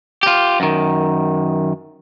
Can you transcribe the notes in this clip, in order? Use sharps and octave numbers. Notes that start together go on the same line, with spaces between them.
F4 G4
F#2 D#3